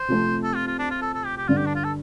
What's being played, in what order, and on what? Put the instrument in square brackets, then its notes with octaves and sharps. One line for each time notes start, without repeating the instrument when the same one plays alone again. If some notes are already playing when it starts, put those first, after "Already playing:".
Already playing: [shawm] C5
[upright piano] C3 F3 A3 C4
[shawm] A4
F4
F4
D4
F4
A4
A4
G4
G4
[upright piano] G2 D3 G3 [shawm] F4
[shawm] G4
D4
F4
A4